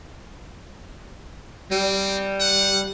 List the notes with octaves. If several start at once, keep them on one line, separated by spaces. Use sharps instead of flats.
G3 C4
F#5